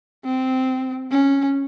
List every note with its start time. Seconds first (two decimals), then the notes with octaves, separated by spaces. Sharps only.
0.25 C4
1.11 C#4